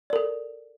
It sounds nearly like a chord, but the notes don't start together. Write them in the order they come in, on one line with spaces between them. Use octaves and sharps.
D5 A#4 A4